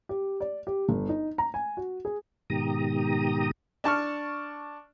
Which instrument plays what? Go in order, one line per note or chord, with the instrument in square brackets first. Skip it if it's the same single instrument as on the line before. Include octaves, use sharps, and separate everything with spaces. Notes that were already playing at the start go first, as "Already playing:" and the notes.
[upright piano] G4
D5
G4
G1
D#4
A#5
G#5
F#4
G#4
[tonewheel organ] G#2 B2 D#3 G4 A#5 D#6
[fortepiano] D4 A5 C#6 F6